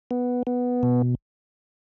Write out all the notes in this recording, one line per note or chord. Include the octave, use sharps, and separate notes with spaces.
B3
B3
B2